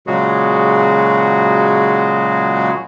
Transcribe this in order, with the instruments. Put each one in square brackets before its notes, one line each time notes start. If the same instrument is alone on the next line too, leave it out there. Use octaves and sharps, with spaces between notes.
[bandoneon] A#2 C#3 F#3 G#3 F#4 G#4